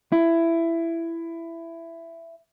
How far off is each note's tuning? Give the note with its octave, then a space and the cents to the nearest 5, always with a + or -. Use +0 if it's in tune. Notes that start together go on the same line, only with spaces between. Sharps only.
E4 +15